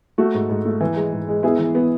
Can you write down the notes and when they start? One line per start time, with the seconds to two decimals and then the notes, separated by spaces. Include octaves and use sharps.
0.18 A3 F#4 A4
0.34 G#2
0.50 G#2
0.66 A3
0.80 E3
0.96 G#3
1.12 G#2
1.29 G#3
1.43 B3 E4 G#4
1.59 E3
1.75 B3